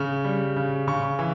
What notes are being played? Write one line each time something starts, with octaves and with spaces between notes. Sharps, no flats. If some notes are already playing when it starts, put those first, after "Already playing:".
Already playing: C#3 C#6
G3
C#3
C#3 C#6
E3